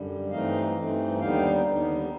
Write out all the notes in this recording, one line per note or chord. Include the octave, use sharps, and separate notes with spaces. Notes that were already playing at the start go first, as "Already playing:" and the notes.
Already playing: F#2 D3 G3
G2 E3 A3 C4 D#4 D#5 F5
G2 E3 A3 C4 D#4
D#2 D3 G3 B3 D#4 F5 G5
D#2 D3 G3 B3 D#4